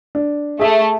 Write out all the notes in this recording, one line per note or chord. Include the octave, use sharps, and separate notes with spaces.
D4
A3 G#4 E5